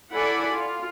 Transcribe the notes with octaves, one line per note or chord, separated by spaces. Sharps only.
E4 A4 D5 F#5 G#5 B5
F4